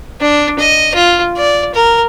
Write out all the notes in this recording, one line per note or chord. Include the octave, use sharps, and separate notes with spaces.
D4
D#5
F4
D5
A#4